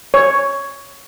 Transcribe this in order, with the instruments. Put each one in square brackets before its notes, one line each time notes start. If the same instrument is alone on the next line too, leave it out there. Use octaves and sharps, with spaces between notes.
[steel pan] C#5